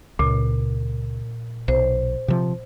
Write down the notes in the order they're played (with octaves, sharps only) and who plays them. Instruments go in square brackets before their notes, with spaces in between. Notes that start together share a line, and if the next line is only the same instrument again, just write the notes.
[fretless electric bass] C#2 [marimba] A#2
[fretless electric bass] B1 [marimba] C5
[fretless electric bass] C3 F3